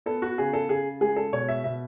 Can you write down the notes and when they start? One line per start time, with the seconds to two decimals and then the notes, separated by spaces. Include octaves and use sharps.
0.06 B3 A4
0.22 F#4
0.38 C#3 G#4
0.53 A4
0.69 C#3 G#4
1.01 G#3 G#4
1.16 A4
1.33 B2 C#5
1.48 E5
1.64 B2 E5